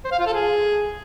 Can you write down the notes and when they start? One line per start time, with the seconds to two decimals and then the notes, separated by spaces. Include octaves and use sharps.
0.04 C5
0.12 F5
0.19 F4
0.26 A4
0.34 G#4